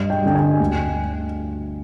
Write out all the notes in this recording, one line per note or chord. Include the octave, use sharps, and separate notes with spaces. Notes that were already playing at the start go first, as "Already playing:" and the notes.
Already playing: G2 D#5
G5
D3 G3 G5
G#5
D2